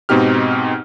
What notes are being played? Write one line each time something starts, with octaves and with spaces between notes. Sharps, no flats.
G#2 B2 C4 D#4 G4 F6